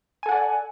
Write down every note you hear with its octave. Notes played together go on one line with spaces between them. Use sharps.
A4 D5 F#5 G#5